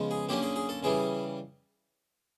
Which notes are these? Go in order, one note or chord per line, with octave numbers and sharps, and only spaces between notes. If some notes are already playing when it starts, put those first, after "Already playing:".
Already playing: C#3 F3 G#3 B3
G#4
D3 F#3 A#3 C#4 G4
G#4
G#4
A4
C#3 E3 G3 G#4